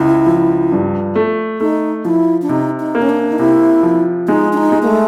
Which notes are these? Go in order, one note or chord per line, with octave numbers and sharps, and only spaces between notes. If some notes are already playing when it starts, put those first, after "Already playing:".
Already playing: C#2 E4
F3
G2
A3
A3 D#4
F3 E4
D4
C3 D#4
D#4
A#3
C#4
D4
D#4
C3 E4
F3
G#3 D#4
D4
D#4
G#3
A#3
A3